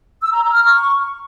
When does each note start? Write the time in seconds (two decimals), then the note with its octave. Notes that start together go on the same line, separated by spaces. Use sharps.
0.22 E6
0.32 A#5
0.42 A#5
0.52 F6
0.62 C#6